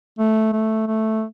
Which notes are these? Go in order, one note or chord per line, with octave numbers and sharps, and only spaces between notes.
A3
A3
A3